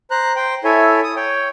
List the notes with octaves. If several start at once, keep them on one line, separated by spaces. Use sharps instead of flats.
C5 A#5 F#6
C5 G5
E4 A4 C#5 E5 G#5
D#6
C#5 G5